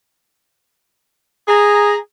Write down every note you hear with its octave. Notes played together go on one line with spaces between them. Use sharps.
G#4 A#5